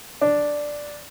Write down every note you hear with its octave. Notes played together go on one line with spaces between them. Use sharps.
D4